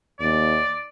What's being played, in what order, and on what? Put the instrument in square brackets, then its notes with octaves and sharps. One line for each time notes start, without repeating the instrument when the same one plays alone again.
[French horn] D#2 [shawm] D5